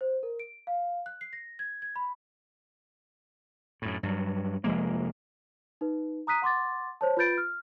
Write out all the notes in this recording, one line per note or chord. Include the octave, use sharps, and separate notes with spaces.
C5
A#4
D7
F5
F#6
C7
A#6
G#6
G#6
B5
F#2 A2
G2 F#3
F1 F3 G#3 A#3
D#4 B4
A#5 D#6 F#6 B6 D#7
F#5 C6 D6 A6
C5 C#5 A5
F4 B4 B5 G6 A6 D7
F6